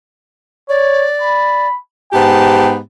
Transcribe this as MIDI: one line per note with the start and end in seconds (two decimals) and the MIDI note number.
0.69 1.07 73
0.69 1.68 74
1.22 1.77 83
2.13 2.77 44
2.13 2.77 59
2.13 2.77 67
2.13 2.75 79
2.13 2.67 81